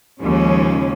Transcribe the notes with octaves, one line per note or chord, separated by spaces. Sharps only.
D#2 C#3 F3 G#3 C#4